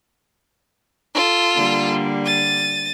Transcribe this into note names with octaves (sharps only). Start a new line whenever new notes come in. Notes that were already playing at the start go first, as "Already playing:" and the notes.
F4 A4
D3 G3 A#3
A6 D#7